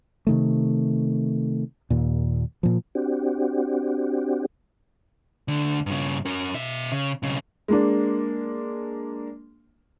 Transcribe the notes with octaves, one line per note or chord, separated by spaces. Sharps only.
C3 D#3 A3
D#2 A#2
A#2 F3
C4 D4 F#4 G4
D2 D3
G2 C#3
C#4 A#4
B2 E5
C#3
B1 C#3
G#3 A#3 D4